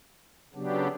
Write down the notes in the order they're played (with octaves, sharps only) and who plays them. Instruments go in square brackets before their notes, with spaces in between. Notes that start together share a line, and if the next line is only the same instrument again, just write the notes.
[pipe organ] C#3 F#3 B3 D4 G4